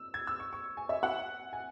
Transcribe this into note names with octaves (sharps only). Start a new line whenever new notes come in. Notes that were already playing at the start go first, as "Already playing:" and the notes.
Already playing: E6
G#6
E6
C#6
C#6
G#5
E5
F#5
G#5